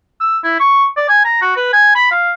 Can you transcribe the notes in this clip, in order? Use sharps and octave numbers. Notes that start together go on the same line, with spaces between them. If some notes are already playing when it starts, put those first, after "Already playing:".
E6
E4
C#6
D5
G#5
A#5
F#4
B4
G#5
B5
F5